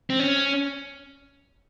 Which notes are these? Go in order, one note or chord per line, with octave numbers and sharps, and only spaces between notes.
C4
C#4